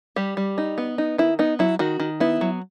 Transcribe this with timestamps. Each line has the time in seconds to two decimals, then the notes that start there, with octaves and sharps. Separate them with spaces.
0.16 G3 G4
0.37 G3
0.58 D#4
0.78 B3
0.98 D#4
1.18 D#3 E4
1.39 B3 D#4
1.59 F#3 E4
1.79 D#3 F#4
2.00 D#3
2.20 B3 E4
2.41 F#3